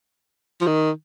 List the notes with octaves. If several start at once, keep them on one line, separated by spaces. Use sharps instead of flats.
F3
D#3